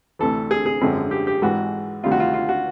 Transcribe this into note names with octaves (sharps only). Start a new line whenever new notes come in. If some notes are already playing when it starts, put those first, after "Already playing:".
D2 C3 E3 A4
G#4
G#4
G#1 F#2 D3 F3 G#3
G4
G4
G#1 G#2 E3 G#3 F#4
D2 C3 D#3 G3 F4
F#4
F4
F4
F#4